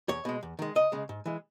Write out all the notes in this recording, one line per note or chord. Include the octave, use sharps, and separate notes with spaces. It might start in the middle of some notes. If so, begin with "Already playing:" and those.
E2 C#5
B2 G#3
E2
D#3 G#3
C#2 D#5
C#3 G#3
G#2
E3 G#3